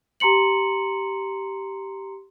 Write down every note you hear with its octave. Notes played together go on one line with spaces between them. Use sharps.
G4 A#5 C6 C#7 F#7